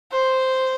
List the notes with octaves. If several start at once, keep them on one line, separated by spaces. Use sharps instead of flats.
C5